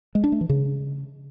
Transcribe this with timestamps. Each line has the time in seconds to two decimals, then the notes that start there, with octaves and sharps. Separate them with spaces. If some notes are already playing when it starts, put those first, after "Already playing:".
0.15 G#3
0.24 D4
0.32 A3
0.41 E3
0.49 C#3